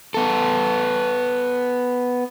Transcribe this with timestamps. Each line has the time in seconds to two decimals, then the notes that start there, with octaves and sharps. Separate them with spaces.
0.14 B3 A4